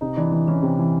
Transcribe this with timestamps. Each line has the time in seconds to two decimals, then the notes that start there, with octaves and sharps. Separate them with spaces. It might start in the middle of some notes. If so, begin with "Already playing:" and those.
0.01 C3 D#4
0.17 E3 D4
0.32 E3
0.48 E3 C#4
0.63 C3
0.79 E3